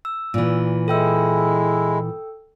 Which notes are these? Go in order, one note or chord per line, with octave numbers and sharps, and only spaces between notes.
E6
A#2 E3
G#3 E4 A4 G5 E6